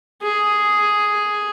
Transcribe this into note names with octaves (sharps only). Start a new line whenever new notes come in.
G#4